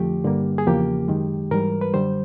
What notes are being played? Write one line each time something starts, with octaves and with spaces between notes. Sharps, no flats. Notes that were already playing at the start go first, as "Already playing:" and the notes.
Already playing: F2 D3 F3 A3 G4
G2 D3 G3 A#3
G#4
E2 C#3 F3 A#3 G4
F#2 D#3 G#3
G#2 E3 G3 A#4
B4
F#2 D3 G3 C5